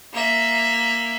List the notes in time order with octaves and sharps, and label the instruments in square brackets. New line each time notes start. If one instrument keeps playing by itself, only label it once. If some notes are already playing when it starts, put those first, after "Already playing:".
[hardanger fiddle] A#3 E5